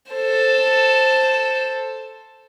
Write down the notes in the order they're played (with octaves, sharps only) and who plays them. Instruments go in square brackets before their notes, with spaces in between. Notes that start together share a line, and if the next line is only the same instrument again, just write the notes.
[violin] A4 C5